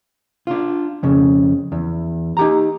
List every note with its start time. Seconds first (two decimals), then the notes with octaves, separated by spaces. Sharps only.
0.47 D4 F4
1.03 F2 C#3
1.72 E2
2.37 D#4 G4 A#5